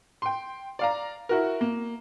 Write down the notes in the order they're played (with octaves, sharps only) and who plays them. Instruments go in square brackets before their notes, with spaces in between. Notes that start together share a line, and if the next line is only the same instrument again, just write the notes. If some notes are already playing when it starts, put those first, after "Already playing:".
[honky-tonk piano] G5 C6
D5 F5 A#5
E4 F#4 A#4
A#3